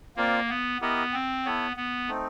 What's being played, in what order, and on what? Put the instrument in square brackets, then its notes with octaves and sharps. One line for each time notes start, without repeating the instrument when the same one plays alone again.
[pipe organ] A#3 [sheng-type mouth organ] C4 F4 A#4 D5 F5
[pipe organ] B3
[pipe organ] B3 [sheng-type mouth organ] E4 G4 A#4 D#5
[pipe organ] C4
[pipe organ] B3 [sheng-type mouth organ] E4 A4 C#5
[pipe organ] B3
[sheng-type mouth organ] A3 C4 D#4